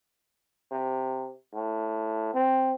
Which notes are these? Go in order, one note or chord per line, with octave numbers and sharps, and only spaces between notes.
C3
A2
C4